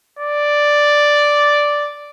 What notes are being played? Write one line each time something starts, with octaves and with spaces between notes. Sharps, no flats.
D5